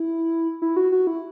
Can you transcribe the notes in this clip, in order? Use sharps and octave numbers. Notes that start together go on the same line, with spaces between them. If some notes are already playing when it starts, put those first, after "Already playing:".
Already playing: E4
E4
F#4
F#4
E4